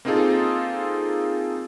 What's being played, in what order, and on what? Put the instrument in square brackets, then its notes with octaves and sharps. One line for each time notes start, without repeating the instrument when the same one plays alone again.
[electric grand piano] A#3 C4 D#4 F4 G#4 A4